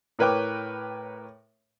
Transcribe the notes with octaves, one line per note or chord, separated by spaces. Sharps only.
A2 A#4 B4 C#5 G5 D6